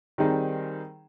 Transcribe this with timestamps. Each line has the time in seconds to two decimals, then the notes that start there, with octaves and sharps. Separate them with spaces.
0.18 D#3 G3 C4 D#4 G#4